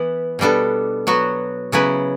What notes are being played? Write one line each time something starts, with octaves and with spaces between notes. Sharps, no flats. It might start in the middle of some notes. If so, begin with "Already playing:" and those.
Already playing: E3 B3 E4 B4
B2 G3 B3 D4 A4
F#3 B3 F#4
C#3 F#3 B3 E4 B4